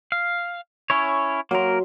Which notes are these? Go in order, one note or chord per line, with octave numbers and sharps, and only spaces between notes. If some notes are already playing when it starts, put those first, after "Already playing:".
F5
C#4 E4 C#5
F#3 A#3 A#4 E5 C6